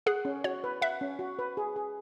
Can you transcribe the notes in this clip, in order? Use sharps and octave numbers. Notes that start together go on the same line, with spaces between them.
G#4 F#5
C#4
F#4 C#5
B4
E5 F#5
C#4
F#4
B4
G#4
G#4